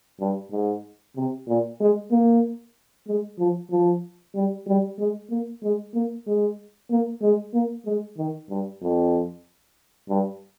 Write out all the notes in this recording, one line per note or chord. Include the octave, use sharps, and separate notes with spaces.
G2
G#2
C3
A#2
G#3
A#3
G#3
F3
F3
G3
G3
G#3
A#3
G#3
A#3
G#3
A#3
G#3
A#3
G#3
D#3
G2
F2
G2